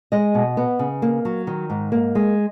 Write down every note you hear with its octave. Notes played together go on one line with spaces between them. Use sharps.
G#3 D#5
B2
B3
C#3
A#3
F#3
D#3
G#2
A#3
G#3